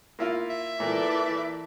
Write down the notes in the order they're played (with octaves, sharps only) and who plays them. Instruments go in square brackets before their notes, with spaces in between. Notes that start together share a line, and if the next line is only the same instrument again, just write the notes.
[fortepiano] A#3 E4 F4
[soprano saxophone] E5
[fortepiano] A#2 [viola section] E3 A4 D5